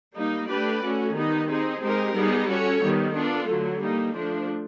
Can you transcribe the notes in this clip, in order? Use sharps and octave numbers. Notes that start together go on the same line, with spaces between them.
G3 A#3 D#4
A3 D4 G4 B4 D5
A3 C#4 F#4
D#3 G3 B3 D#4
C4 D#4 G#4
G#3 C4 D#4 G4 A#4
G3 B3 D#4 G#4
C#4 F#4 A4 C#5
D#3 G3 B3
B3 D4 F4 A4
D3 F#3 A3
G3 A#3 D#4
F3 A3 D4